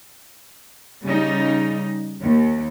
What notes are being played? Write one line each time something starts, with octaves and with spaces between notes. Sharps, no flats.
C#3 G3 D#4
D#2